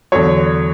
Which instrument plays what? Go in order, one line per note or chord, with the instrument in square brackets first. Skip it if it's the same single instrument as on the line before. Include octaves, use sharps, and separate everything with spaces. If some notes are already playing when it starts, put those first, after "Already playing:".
[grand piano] E2 D3 F#3 C#5